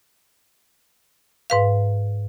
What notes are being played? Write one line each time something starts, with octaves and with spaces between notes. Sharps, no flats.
G#2 B4 F5